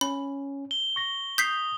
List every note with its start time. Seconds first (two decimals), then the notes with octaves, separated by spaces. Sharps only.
0.01 C#4 B5
0.71 G7
0.96 C#6 A#6
1.38 D#6 G6 B6 C7